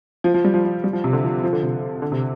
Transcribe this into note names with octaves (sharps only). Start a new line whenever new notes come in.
F3
F3
G3
F3
F3
G3
F3
C3
D3
F3
F3
D3
C3
D3
C3